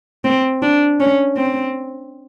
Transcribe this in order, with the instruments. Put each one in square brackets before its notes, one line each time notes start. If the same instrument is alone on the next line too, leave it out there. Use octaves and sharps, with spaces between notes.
[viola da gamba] C4
D4
C#4
C4